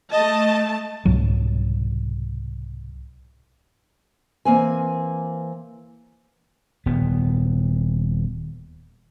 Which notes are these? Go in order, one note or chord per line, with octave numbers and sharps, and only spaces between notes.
A3 D#5 A5
C2 G#2 B2 F#3
E3 A#3 C4 G#5
D#1 B3